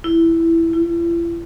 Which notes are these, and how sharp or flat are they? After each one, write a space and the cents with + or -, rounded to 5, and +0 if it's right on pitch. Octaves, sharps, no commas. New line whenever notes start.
E4 +5
E4 +45